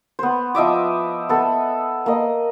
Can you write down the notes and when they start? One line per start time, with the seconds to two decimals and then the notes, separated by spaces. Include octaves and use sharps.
0.19 B3 C5
0.55 F3 D#5 E5 D6
1.29 B3 A4
2.06 A#3 D#5